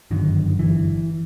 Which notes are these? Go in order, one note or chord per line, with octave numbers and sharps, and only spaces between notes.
G1 F#2 D3 D#3
E3